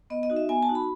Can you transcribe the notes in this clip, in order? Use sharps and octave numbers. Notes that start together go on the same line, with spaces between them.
B3 D#5
D#5
D#4 F#4
E5
B3 G#5
A5
D#4 F#4
B5